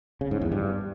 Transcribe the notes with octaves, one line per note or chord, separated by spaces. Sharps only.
C#3
G#2
E2
G2